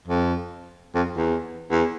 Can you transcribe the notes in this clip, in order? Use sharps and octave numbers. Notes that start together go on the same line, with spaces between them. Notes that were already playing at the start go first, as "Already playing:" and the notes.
F2
F2
E2
E2